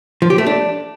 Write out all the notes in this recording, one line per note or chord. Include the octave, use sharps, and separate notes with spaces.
F3
G4
A3
D4